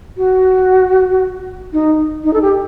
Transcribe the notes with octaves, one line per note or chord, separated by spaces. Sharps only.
F#4
D#4
D#4
A4
G4